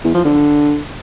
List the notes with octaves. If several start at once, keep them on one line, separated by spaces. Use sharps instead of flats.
E2
F3
D3